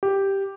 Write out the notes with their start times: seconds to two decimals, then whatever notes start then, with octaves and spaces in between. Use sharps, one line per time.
0.03 G4